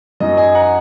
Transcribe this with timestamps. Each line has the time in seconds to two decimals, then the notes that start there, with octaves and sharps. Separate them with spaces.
0.20 F#2 F#3 D#4 D#5
0.37 D#5 G#5
0.55 F#5 A#5